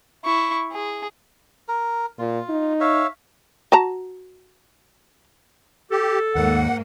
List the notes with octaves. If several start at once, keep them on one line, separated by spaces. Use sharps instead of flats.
E4 C#6
G#4
A#4
A#2 F4
D#4
C#5 E5 F5
F#4 A5 A#5
G4 A4
D#2 G#2 A#3 F#5